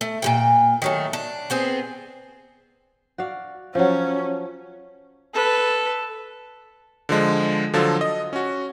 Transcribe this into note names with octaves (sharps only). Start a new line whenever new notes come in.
A3
A#2 G3 G5
D#3 F#3 A3
D4
B3 C4 G#4
F#4 D5 F5
F3 F#3 C#4
A4 B4
D3 F3 G#3
D3 F3 F#3 F4 A4
D#5
C#4 F#4